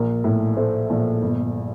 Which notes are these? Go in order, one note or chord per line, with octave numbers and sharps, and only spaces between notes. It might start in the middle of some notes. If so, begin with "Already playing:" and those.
Already playing: A#1 A#4
A2
A3 C5
A#1
G1